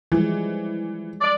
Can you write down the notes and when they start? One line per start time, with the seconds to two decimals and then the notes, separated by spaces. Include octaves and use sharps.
0.12 E3 F3 G3 G#3
1.21 D5